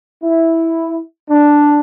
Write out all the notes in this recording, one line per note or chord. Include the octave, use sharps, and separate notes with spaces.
E4
D4